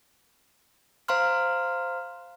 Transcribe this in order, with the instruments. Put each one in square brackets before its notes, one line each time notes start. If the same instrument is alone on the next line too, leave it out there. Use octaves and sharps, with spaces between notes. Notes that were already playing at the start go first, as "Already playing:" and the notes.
[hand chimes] C5 F5 A#5 C6 F6